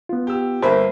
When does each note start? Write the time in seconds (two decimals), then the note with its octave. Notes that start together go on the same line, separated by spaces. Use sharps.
0.09 B3 F4
0.27 G4 E6
0.63 G1 A#3 C5 E5 B5